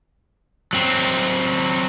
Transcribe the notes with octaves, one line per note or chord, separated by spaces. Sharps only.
F#3 C4